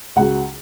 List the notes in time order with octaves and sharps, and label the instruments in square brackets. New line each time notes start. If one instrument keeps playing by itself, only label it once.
[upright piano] C#2 C#3 F#3 F#5